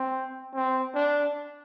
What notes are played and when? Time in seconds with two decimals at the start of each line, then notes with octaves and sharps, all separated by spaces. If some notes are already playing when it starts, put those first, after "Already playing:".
Already playing: C4
0.55 C4
0.95 D4